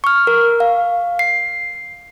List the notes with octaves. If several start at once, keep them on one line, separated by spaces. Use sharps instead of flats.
C#6 F6
A#4
F5
C7